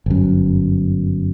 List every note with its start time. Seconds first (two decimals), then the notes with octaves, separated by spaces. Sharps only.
0.06 G1 F#2